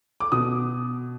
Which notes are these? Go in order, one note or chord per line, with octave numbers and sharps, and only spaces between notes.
D6
B2 D#6